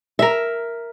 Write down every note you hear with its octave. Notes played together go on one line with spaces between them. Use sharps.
A#4 E5